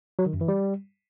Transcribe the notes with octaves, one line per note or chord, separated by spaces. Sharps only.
F#3
D#3
F#2
E3
G3